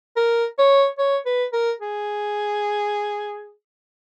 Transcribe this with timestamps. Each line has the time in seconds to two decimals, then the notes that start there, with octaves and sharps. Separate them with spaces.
0.16 A#4
0.58 C#5
0.98 C#5
1.26 B4
1.53 A#4
1.80 G#4